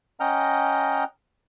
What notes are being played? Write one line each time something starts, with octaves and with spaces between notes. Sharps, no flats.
C#4 D#5 F#5 G5 A#5 F6